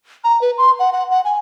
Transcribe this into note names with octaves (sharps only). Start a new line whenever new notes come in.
A#5
B4
C6
F#5
F#5
F#5
G#5